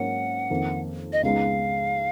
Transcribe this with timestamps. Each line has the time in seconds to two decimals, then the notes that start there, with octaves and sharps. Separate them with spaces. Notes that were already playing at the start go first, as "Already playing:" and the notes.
Already playing: G#2 F#3 A#3 C#4 F#5
0.50 F2 D#3 A#3
1.13 D#5
1.23 C#2 C#3 G#3 B3 D#4 F5